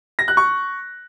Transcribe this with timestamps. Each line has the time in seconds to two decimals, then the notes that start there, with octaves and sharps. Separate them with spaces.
0.19 A#6
0.28 F#6
0.37 C#6